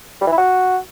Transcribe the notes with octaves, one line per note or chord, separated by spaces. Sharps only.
G3
E3
E4
F#4